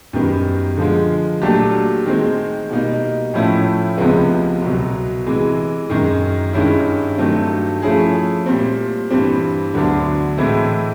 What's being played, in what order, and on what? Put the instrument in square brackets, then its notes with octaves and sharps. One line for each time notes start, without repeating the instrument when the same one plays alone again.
[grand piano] F#2 D#3 G3 B3
D3 F3 G#3
A#2 F#3 A3 D4 G4
D#3 G#3 C4
B2 G3 A#3 D#4
A2 F3 A3 C#4 E4
C#2 C3 F3 G#3 B3
C2 B2 F#3
C3 E3 G#3
F#2 D#3 G#3
G2 D#3 G#3 C#4 E4
G2 D#3 F#3 A3 C4
F3 A3 C#4 E4 G#4
A#2 G3 C4
G2 E3 G3 C4
D2 D3 F#3 B3 D4
A2 E3 G#3 C4 E4